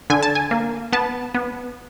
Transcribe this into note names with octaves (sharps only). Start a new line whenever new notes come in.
D3 G#5
A5
G#5
A#3
B3 A5
B3